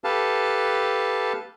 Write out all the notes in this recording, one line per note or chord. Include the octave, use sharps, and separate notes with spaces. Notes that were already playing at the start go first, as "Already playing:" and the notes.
G4 A4 B4 F5 A5